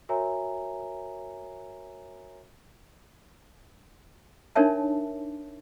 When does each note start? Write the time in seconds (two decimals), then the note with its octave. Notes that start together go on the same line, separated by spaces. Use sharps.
0.09 F#4 A#4 C#5 E5 G#5 A#5
4.55 D4 D#4 A#4 C#5 E5 A5